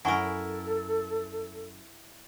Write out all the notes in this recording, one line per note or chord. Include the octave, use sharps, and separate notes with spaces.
F#2 E4 A4 A#4 F#5 G#5 C#6